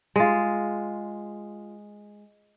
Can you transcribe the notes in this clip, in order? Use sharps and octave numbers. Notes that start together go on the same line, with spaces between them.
G#3 F4